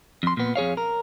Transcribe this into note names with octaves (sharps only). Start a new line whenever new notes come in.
F2 C6
A#2 B3
F2 G#4 C#5 F5
A#4